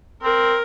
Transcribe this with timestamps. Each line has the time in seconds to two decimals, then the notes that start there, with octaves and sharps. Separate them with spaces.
0.23 C4 A#4